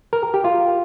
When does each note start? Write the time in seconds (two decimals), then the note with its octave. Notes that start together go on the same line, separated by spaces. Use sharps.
0.13 A#4
0.34 G4
0.45 F4